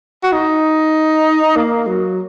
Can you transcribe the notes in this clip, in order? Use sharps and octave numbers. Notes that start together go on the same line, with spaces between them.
F#4
D#4
A#3
F#3